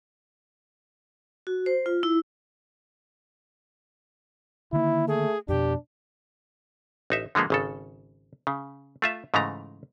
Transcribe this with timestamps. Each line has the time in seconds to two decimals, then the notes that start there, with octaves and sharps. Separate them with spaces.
1.47 F#4
1.66 C5
1.86 F4
2.03 E4
4.73 D3 D#3 A#3 E4
5.08 A3 G#4
5.49 F2 B2 D4 G4
7.10 A1 D#4 E5
7.35 D3 F3 G#3 A#3 B3
7.50 G#1 C#3 A4
8.47 C#3
9.02 A3 F4 E5
9.34 G#2 C#3 E3 A3 A#5